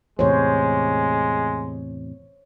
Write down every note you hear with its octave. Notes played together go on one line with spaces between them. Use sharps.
E2 A2 C3 G#3 C5 C#5